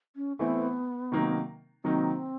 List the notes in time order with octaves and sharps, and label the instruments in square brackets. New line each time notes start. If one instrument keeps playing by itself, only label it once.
[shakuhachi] C#4
[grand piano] E3 A3 C4 E4 [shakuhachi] B3
[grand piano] C3 D#3 F#3 A#3 D#4
[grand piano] C3 D#3 F#3 A#3 D#4 [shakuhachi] C4